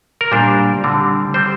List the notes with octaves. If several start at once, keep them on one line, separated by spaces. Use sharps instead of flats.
A#4
A#2 G3 D4 C5
D3 G3 C4
G3 C4 C5